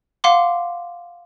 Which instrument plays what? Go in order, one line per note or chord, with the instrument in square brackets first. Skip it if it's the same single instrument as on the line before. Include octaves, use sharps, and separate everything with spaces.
[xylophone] F5 F#5 C6 D6